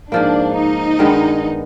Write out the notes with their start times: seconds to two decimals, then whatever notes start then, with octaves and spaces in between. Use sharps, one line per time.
0.12 G#2 F3 A#3 D4
0.56 D#4
0.99 G2 D#3 G#3 B3